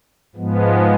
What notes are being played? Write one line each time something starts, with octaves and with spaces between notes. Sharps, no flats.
G#2 F3 G#3 B3